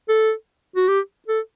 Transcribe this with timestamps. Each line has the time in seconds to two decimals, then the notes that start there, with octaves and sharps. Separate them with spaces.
0.09 A4
0.76 F#4
0.88 G4
1.28 A4